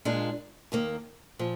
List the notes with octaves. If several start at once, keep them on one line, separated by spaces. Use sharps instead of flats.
A#2 G#3 D4 F4
D#2 D#3 A#3
A#2 F3